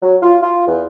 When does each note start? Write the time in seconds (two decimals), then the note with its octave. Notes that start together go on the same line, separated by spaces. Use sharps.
0.03 F#3
0.22 F4
0.43 F4
0.68 E2